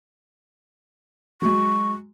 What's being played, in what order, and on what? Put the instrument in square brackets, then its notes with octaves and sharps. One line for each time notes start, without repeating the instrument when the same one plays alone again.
[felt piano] F#3 G#3 [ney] C#6